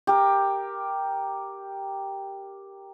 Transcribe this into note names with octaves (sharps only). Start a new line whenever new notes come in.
G4 A#4